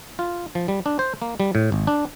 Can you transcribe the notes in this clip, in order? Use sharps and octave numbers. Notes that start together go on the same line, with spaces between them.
F4
F3
G3
D4
C5
A#3
G3
A2
G#1
D4